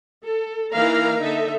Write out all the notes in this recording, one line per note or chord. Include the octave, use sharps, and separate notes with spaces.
A4
E3 A#3 D#4 A#4 F5 A#5
D3 D#4 A4 E5